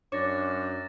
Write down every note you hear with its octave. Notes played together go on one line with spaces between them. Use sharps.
F#2 D4 C#5 D6 A6 A#6